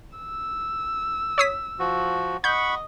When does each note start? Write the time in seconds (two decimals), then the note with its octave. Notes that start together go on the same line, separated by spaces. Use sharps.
0.17 E6
1.38 C#5 D#6 B6
1.79 F3 F#4
2.44 D#5 F#5 B5 C#6 G6